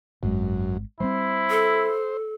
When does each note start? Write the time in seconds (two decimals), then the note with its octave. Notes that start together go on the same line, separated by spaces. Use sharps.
0.23 G#1 F#2 G#3
1.00 G3 G#3 C4 E4 C5
1.50 A4